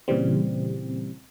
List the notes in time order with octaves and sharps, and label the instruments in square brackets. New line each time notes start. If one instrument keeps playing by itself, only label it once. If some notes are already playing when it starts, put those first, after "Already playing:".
[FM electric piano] A#2 C#3 E3 G3 C4